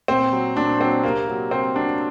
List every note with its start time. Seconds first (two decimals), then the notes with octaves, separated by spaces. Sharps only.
0.08 A#2 C4
0.32 F#3
0.57 A#2 D4
0.80 F#3 C4
1.03 C3 A#3
1.28 F#3
1.51 C3 C4
1.75 F#3 D4